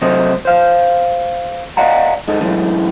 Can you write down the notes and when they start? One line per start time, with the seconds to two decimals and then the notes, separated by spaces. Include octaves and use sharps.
0.01 C3 F#3 A3 C5 D#5
0.45 C5 F5
1.77 D5 D#5 F5 F#5 A#5
2.28 G#3 D#4 A4
2.41 F#2 A2 E3 G#3